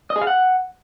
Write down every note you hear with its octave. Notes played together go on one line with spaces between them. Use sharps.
D#5
G#4
F5
F#5